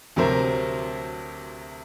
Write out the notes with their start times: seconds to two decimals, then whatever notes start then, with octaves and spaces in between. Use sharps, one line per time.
0.16 D2 C3 F#3 A#4 C5